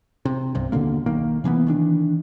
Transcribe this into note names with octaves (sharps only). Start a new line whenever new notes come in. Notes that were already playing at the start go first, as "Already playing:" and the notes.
C3
C2 G2 C3
D#2 B2 D3 A#3
B1 D#3 A#3
C3 E3 A#3 B3
D#3 E3 D4